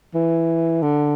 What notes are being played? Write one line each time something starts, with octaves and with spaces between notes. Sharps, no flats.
E3
D3